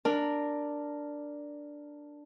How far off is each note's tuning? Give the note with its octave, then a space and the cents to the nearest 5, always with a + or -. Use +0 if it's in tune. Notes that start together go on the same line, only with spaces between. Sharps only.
D4 +0 A#4 -5